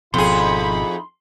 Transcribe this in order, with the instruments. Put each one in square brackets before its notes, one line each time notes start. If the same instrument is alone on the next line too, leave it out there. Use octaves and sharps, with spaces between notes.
[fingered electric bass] G#1 B2 [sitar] F2 G#4 [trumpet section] D#4 E4 B5 [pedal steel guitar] C6